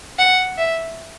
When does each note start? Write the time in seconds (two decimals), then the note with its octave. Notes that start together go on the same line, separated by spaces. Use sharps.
0.19 F#5
0.58 E5